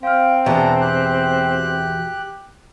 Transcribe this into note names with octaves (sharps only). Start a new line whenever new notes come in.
C4 F5 G5 F6
E2 B2 D4 E5 A#5
G4 F#6